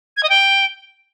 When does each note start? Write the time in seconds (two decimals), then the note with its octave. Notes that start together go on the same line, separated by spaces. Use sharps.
0.17 G#6
0.23 D#5
0.29 G5